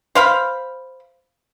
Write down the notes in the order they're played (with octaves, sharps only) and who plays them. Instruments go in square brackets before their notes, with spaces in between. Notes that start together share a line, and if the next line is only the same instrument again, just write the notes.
[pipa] C5 F5 B5